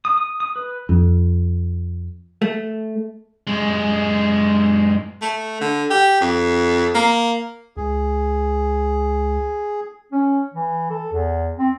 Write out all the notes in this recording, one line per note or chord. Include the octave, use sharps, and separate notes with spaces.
D#6
D#6
D#6
B4
F2
A3
F#2 G#3
A3
D3
G4
F2
A#3
C#2 G#4
C#4
E3
A4
E2
C4